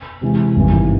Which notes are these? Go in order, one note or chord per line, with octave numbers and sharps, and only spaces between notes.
C3 E3 G#3
G#1 G2 E3